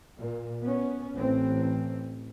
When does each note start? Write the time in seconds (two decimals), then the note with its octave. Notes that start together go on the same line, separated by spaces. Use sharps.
0.18 A#2
0.62 B3 C#4
1.17 A1 E3 C4